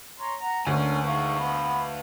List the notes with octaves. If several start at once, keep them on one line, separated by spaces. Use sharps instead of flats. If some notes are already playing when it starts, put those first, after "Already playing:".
C#5 A#5 C6
F#5 A#5
D2 D3 A#3 C#4 G#5
D#3 G#4 B4 F5 C#6
B3 B5